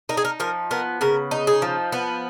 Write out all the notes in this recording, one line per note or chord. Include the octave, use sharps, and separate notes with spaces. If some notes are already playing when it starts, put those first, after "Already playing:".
D#4 A#4
G#4
A#4
F3 A#4
B3 A#4
C#3 A#4
D#4
G#4
F3
B3